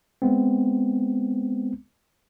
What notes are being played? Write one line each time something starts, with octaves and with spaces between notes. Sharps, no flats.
G#3 B3 C4